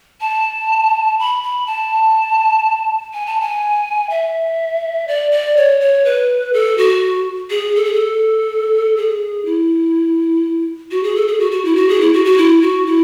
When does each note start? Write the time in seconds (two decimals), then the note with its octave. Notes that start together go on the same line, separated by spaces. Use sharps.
0.21 A5
1.19 B5
1.43 B5
1.67 A5
3.14 G#5
3.26 A5
3.41 G#5
4.10 E5
5.08 D5
5.31 D5
5.56 C#5
5.81 C#5
6.05 B4
6.53 A4
6.78 F#4
7.50 G#4
7.76 A4
7.85 G#4
7.94 A4
8.97 G#4
9.45 E4
10.91 F#4
11.03 G#4
11.16 A4
11.27 G#4
11.40 F#4
11.52 F#4
11.65 E4
11.76 F#4
11.89 G#4
12.01 E4
12.13 F#4
12.25 F#4
12.38 E4
12.62 F#4
12.86 E4